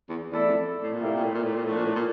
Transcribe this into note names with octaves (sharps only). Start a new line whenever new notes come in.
E2
E2 A3 E4 A4 D5
F2
A2
A#2
A2 C3 G3 A#3 E4 G4
A#2
A2
A#2
A2
A#2
A2 F3 A3 D4
A#2
A2
A#2